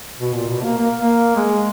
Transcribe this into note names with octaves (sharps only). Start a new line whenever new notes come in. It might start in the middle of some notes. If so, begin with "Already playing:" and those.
B2
A#2
B2
A#3
A#3
A#3
G#3